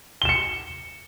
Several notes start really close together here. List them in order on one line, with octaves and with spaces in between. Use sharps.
G7 E7 C#7